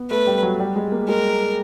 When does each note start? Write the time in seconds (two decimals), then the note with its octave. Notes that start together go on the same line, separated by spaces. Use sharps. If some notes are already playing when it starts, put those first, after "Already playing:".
Already playing: B3
0.10 A3 B4
0.27 G3
0.43 F#3
0.60 G3
0.76 G#3
0.92 A#3
1.08 G#3 A#4